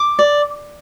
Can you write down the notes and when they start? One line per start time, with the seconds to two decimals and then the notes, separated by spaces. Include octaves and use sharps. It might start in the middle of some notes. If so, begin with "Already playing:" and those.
Already playing: D6
0.19 D5